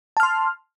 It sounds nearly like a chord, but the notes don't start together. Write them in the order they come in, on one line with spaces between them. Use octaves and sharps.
A5 F6 C6